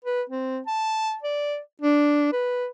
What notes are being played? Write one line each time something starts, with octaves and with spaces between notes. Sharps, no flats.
B4
C4
A5
D5
D4
B4